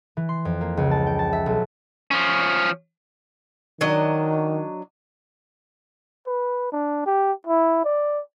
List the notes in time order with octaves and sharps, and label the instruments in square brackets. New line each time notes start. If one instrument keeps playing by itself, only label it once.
[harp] E3
C6
F2
A#3
C#2
A5
G5
A5
E5
B1
[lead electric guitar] F3 C#4
[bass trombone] D#3 [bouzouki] F#3 D4 D#5
[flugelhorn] B4
D4
G4
E4
D5